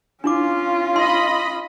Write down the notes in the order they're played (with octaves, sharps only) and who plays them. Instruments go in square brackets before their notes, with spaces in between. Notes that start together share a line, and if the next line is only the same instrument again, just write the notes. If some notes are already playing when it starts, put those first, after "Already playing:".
[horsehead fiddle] C#4 F4 [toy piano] D4 E4 D6
[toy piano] D#4 C6 [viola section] D#5 B5